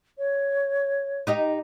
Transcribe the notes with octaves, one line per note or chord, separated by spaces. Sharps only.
C#5
D#4 G4 D#5